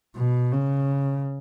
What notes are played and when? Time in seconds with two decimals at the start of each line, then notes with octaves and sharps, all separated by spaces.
0.16 B2
0.52 C#3